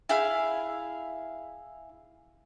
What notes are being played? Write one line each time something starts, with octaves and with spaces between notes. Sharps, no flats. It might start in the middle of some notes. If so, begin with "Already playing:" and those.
E4 G#4 F5